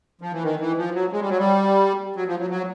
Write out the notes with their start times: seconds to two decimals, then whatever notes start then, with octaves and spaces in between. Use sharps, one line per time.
0.21 F3
0.32 E3
0.43 D#3
0.60 E3
0.77 F3
0.94 F#3
1.12 G#3
1.21 G3
1.29 F#3
1.38 G3
2.16 F#3
2.27 F3
2.39 F#3
2.50 F#3